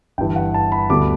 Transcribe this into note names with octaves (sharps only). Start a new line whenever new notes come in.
G1 G2 E3 G5
F#5
A5
B5
D2 D3 G3 B3 D6